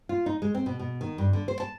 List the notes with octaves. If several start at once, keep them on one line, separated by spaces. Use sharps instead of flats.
F4
D#4
G#3
C4
B2
B2
D#3
G2
D3
C5
A5